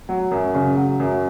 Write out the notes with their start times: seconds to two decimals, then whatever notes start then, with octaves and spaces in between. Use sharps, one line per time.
0.09 F#3
0.31 F#2
0.55 C#3
0.77 F#3
1.00 F#2